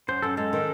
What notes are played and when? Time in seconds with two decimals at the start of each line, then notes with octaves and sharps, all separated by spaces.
0.08 F#2 C5
0.22 F#2 A4
0.37 G#3 A4
0.53 D#3